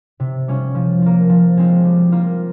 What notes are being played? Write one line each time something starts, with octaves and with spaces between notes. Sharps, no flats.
C3
G3 C#4 F4
F3
A#3 F4
F3
G#3 C4 F4
G3
A#3 F4